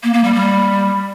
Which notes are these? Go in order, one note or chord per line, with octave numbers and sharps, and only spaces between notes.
A#3
A#3
G3
G3